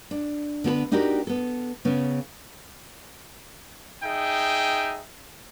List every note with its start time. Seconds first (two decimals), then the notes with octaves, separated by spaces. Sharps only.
0.11 D4
0.64 D3 B3 G#4 B4
0.92 D4 D#4 F#4 G4 A#4
1.27 B3 A4
1.85 C#3 B3 C#4
4.03 D#4 G#4 E5 G5